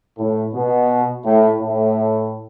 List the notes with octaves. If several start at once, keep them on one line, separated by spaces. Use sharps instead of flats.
A2
B2
A2
A2